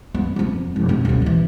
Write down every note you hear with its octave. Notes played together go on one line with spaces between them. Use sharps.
B3
F2 F3
F1
B2
D#1 D2
A1 E3